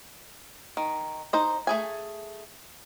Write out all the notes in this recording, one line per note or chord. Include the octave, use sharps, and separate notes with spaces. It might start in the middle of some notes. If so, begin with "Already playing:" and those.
D#3
D#4 C5 D#5
A3 G#4 G#5